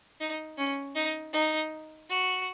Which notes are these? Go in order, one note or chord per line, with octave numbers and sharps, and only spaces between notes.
D#4
C#4
D#4
D#4
F#4